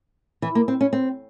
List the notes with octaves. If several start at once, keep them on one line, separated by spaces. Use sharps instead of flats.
E3
A#3
C4
C#4
C4